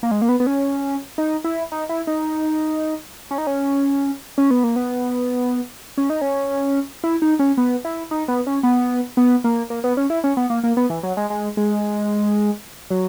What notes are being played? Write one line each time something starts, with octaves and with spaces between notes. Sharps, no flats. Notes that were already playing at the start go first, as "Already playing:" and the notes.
A#3
G#3
A#3
B3
B3
C#4
D#4
E4
D#4
E4
D#4
C#4
D#4
C#4
C#4
B3
A#3
B3
C#4
D#4
C#4
E4
D#4
C#4
B3
E4
D#4
B3
C#4
B3
B3
A#3
A#3
B3
C#4
E4
C#4
B3
A#3
A#3
B3
E3
F#3
G#3
G#3
G#3
F#3